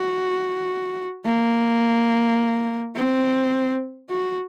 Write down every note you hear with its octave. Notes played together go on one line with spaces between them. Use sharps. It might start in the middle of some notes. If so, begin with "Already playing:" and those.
Already playing: F#4
A#3
C4
F#4